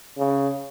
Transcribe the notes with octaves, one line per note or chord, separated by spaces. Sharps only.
C#3